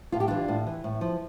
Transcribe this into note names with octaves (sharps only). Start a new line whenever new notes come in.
A2 F4
G4
E3 D4 F4
A2
E3
A2
F3